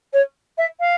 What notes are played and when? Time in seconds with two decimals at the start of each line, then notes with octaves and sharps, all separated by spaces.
0.13 C#5
0.58 E5
0.80 F5